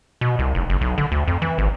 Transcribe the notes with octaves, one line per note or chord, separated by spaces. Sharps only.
B2
C2
F1
F#1
B1
D3
D2
F2
E3
G#1